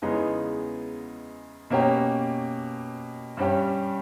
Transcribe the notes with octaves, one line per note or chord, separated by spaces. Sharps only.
E2 C#3 G#3 B3 D#4
B2 A#3 C#4 G4
G2 G3 C#4 G4